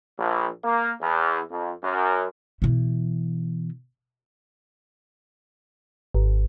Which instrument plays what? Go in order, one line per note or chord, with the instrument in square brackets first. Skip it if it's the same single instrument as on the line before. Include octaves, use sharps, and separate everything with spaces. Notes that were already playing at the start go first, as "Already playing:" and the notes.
[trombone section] A#1
A#3
E2
F2
F#2
[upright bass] B2 E3
[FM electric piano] G#1